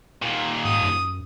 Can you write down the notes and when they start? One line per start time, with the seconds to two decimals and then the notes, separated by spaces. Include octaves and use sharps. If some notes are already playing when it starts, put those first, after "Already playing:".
0.22 D#2 A#2
0.65 G#2 D#6
0.82 F#2